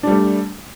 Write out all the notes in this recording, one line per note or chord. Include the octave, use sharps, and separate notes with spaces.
G3 A3 D4